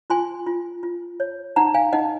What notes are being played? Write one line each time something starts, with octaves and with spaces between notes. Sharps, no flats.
F4 G#5 C6
F4
F4
C#5
D#4 F#5 A#5
F5 G#5
D#4 D#5 F#5